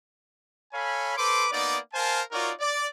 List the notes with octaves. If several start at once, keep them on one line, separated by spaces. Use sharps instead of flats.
A4 C#5 F5 G#5 B5
A4 B4 C5 C6 D6
A#3 B3 D#4 D5
A#4 C5 F5 G#5 A5
D#4 F4 F#4 A#4 C#5 D5
D5